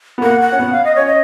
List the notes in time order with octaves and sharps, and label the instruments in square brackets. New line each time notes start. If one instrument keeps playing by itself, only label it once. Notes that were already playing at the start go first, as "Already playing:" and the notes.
[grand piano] B3
[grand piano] A#3 [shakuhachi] F#5
[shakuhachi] F#5
[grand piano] C#4
[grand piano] B3 [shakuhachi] F#5
[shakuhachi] F5
D#5
[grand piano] C#4 [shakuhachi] C#5
[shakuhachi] D#5